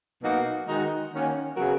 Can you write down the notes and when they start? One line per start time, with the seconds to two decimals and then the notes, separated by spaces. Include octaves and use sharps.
0.22 B2 F#3 A#3 D#4 F#4
0.66 D#3 G#3 D#4 F#4
1.12 D#3 A#3 C#4 F#4
1.56 C#3 F#3 B3 F#4 A#4